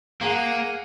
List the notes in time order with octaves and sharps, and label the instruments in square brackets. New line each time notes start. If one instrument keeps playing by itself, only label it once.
[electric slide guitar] A#3 [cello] G#4 F#5